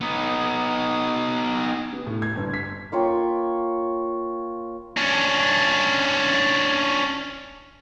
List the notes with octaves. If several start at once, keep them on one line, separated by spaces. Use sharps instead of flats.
B3 D#4
B3
A2
G#6
G1
B6
A#3 F4 C#5 G5
C#4 D4